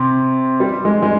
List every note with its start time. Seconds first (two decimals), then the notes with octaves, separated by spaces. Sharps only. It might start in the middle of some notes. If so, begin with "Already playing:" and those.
Already playing: C3 C6
0.60 G3
0.85 G#3
1.02 G#3